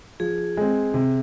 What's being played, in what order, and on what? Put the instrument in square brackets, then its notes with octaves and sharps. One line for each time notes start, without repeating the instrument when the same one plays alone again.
[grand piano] F3 [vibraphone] G#4
[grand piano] G#3 C4
C3